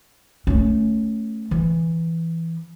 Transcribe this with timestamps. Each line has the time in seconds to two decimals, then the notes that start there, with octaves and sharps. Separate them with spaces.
0.47 A3 C#4
1.51 E3